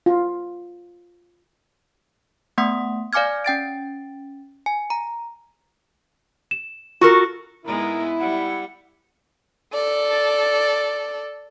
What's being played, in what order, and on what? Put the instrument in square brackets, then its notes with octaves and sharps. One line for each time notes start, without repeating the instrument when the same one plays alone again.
[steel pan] F4
[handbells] A3 B3 F#5 C6 D#6
D5 F5 G#5 D6 F6 G#6
C#4 G5 A6 D7
G#5
A#5
[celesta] E7
[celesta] F4 [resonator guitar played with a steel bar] F#4 A4 A#4
[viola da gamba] G#2 G#3 B3 [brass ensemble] E4 [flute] A#4
[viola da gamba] G3 [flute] F#5
[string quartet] A4 D5